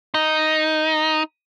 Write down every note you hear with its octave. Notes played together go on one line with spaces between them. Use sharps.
D#4